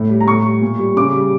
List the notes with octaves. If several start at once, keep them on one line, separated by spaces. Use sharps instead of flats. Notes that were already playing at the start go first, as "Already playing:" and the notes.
Already playing: A2
G3
A#5
A2 C#6
G3
A#2
G3
C#3 D6
G3